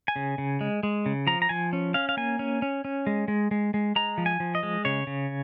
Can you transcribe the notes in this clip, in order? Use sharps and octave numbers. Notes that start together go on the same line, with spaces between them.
G#5
C#3
C#3
G#3
G#3
C#3
F3 A#5
A#5
F3 G#5
C#4
C#4 F5
F5
A#3 G#5
C#4
C#4
C#4
G#3
G#3
G#3
G#3
G#3 A#5
F3
G#5
F3
D#5
G#3
C#3 C#5
C#3